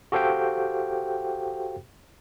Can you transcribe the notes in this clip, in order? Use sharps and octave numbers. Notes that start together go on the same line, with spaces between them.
F#4 G4 A4 C5 F5 G5